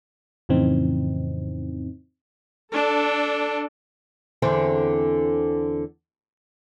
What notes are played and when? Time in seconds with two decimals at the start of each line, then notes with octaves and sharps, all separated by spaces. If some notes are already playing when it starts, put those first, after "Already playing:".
0.49 F2 A2 C#3 E3 C4 D#4
2.72 D4 A4
4.42 E2 D3 C4